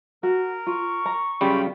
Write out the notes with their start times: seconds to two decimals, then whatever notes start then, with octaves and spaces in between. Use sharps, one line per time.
0.23 F#4 A#4
0.67 F4 C#6
1.06 A#5
1.41 F#2 C#3 G3 F4 G5 B5